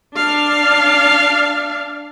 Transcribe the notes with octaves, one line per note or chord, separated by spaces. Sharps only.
D4 F5